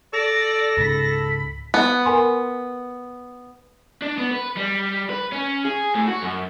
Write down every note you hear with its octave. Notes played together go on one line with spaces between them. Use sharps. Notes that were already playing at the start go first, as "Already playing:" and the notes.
A4 D5 A#6
C#2 G#2 C#3 B5
B3
A#4 G#5 C6
D4
B3
B4
G3
B4
C#4
G#4
A2
F#4
F#2